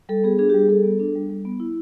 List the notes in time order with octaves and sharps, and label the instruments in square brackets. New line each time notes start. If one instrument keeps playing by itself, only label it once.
[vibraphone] G3 A4
B3 G#4
D4 G#4
G4
G3
G#4
G3 A4
B3
D4
G3
G3
B3
E4